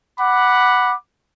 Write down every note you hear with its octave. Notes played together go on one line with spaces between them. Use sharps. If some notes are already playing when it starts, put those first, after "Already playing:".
F#5 B5 D6